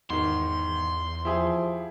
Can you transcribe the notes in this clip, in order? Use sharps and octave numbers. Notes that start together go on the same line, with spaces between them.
E2 G#2 D#3 C6
F3 E4 G4 G#4